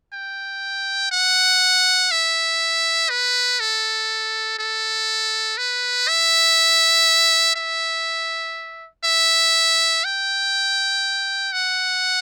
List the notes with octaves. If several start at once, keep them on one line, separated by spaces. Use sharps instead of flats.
G5
F#5
E5
B4
A4
A4
B4
E5
E5
E5
G5
F#5